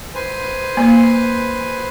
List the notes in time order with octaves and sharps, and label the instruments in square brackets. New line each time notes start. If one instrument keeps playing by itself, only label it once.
[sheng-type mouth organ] B4 C5 G#5
[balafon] A#3